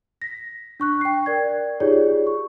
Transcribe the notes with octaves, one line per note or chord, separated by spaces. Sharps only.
A#6 B6
D4 C#6 F#6
G5 C7
A#4 D5 G#6
D#4 F4 G4 G#4 C#5 D5
C#6